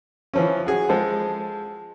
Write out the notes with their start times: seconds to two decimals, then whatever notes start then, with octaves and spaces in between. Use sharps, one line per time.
0.34 E3 F3 C#4
0.66 F#4 G#4
0.89 F3 G#3 A4 C5